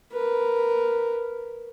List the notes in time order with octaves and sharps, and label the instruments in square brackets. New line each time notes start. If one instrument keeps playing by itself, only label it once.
[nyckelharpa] A#4 B4